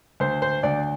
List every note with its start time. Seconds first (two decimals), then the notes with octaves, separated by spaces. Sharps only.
0.20 D2 C5
0.42 C5
0.63 D2 D5